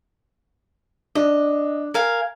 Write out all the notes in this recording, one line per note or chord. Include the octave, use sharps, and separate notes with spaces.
D4 D#5
A#4 F5 G#5